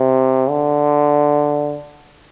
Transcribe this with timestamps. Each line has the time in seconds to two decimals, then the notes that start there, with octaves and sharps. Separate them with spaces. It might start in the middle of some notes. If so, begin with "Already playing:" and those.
Already playing: C3
0.50 D3